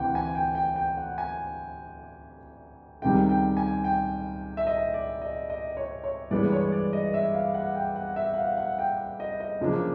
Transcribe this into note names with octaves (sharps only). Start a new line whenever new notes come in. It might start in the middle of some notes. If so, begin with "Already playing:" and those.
Already playing: D2 C3 E3 F#5 G5
G#5
G5
G5
G5
F#5
G#5
C#2 C3 D#3 G3 G5
G5
G#5
G5
E5
D#5
D5
D#5
D#5
C#5
C#5
G2 E3 G#3 B3 D5
C#5
D5
D#5
E5
F5
F#5
G5
F#5
E5
F#5
F5
F#5
G5
D#5
D#5
F#2 C#3 F3 A#3 D4